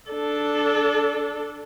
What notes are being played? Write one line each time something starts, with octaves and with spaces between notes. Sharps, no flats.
D4 A4